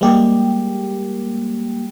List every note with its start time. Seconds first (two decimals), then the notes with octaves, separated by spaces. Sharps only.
0.01 G3 G#3 A#3 G4